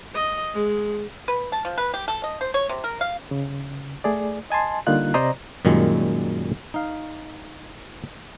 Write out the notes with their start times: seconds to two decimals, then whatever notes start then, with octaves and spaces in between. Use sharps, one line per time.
0.14 D#5
0.54 G#3
1.28 B4
1.52 A5
1.65 F3
1.78 B4
1.94 G4
2.08 A4
2.24 D#5
2.41 C5
2.54 C#5
2.69 C3
2.84 A#4
3.01 F5
3.31 C#3
4.04 A3 G#4 D5
4.50 D#5 G#5 A5 C6
4.87 D3 G3 A#3 D#4 F4 F#6
5.14 C3 C5 D5 D#5 A#5
5.65 F#2 A#2 D#3 G3 G#3
6.74 D#4 F5